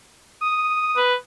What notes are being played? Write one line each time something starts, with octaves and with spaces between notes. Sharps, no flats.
D#6
B4